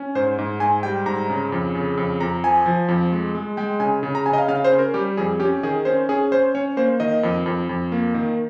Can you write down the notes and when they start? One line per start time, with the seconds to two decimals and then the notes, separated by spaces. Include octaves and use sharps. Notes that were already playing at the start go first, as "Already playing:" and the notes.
Already playing: C#4
0.15 G#2 C5
0.38 G#2
0.60 G#2 G#5
0.83 G3 G5
1.06 G#2 A#5
1.30 C#3
1.52 F2
1.75 C#3
1.97 F2
2.20 F2 A#5
2.44 F3 G#5
2.66 F3
2.88 F2
3.12 G#3
3.35 G#3
3.57 G#3 G5
3.80 C#3 G#5
4.03 C#3
4.15 A#5
4.26 C#3 G#5
4.33 D#5
4.38 F5
4.48 C#3 F5
4.65 C5
4.72 C#4
4.79 A#4
4.94 G3 G4
5.17 F2 G#4
5.40 C#4 G4
5.63 D#3 G#4
5.85 C#4 C5
6.09 C#4 G#4
6.32 C#4 C5
6.55 C#4 C#5
6.77 A#3 C5
7.00 D#3 D#5
7.23 F2
7.46 F2
7.69 F2
7.92 A#3
8.14 D#3